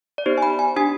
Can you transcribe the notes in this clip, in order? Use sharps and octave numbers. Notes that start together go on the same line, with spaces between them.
D5
B3 D#4 G4 C5
G#5
B5
G#5
D4 G4 G#5